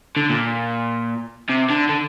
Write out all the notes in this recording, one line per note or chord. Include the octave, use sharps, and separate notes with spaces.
D3
A#2
C3
D3
D3